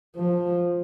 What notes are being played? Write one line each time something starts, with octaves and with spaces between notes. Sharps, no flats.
F3